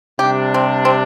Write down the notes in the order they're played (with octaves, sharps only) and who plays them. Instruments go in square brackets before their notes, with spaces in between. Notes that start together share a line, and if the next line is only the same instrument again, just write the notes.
[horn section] C3 G3 D4 [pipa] G4
[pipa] C4
C4